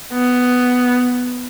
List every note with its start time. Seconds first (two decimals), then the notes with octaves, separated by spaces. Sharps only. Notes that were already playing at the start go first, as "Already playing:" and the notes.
0.13 B3